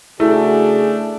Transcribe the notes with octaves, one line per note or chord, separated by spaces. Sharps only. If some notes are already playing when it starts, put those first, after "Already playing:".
C#3 A3 D4 E4 F#4 G#4